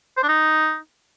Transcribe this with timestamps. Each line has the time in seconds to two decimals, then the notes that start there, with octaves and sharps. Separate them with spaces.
0.17 C5
0.23 D4
0.29 D#4